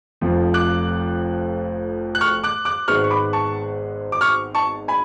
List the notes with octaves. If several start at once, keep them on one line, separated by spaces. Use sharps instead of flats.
F1 F2 F3
D6 F#6
F#6
C#6 F6
D6 F#6
D6 F#6
G#1 G#2 G#3 B3 C#6 F6
C#6
B5 D6
A5 C#6
D6
C#6 F6
A5 C#6
G#5 B5